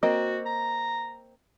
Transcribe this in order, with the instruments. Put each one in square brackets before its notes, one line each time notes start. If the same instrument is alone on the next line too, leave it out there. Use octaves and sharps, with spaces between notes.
[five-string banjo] A#3 C4 D#5 [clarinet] F#4
[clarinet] A#5